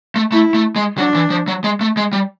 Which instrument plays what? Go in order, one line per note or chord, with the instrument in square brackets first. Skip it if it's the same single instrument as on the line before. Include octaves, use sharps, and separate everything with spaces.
[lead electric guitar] A3
[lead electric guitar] A3 [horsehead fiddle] E4
[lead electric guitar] A3
G#3
[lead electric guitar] F#3 [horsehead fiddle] D4
[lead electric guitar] E3
F3
F#3
G#3
A3
G#3
G3